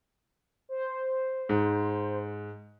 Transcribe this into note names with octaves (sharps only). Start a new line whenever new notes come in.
C5
G#2